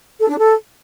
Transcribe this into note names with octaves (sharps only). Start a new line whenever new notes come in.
A4
D4
A4